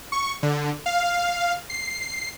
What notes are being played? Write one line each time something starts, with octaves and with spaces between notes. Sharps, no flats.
C#6
D3
F5
C7